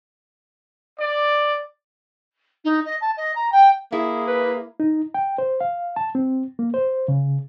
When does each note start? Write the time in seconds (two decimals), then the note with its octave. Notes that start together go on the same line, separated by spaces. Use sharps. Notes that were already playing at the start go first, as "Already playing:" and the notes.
0.99 D5
2.64 D#4
2.85 D#5
3.01 A5
3.17 D#5
3.35 A#5
3.52 G5
3.92 A#3 E4 G#4
4.28 B4
4.80 D#4
5.14 G5
5.38 C5
5.61 F5
5.96 A5
6.15 C4
6.59 A#3
6.74 C5
7.08 C#3